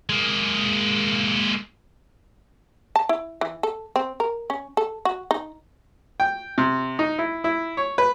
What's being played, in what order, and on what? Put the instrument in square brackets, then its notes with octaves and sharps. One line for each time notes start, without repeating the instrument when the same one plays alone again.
[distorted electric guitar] G#3 A#3
[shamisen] A5
E4
E3
A4
C4
A#4
C#4
A4
F#4
D#4
[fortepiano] G5
C3
D#4
E4
E4
C#5
B4